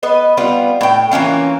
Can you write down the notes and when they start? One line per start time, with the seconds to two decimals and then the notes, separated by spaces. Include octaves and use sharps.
0.03 B3 B4 D#5
0.37 G3 B3 F4
0.81 A2 G5
1.12 E3 A#3 C#4 F4